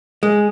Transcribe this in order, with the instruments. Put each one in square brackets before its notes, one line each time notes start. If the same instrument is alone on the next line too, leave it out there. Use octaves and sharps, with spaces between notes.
[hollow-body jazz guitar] G#3